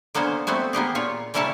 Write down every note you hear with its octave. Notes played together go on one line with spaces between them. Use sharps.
D3 A#3 B3 C#4 C5
A3 B3 C4 F#4
A#3 B3 G4 G#4
A#2 F4 C#5
C#3 G3 A#3 E4 C#5 A5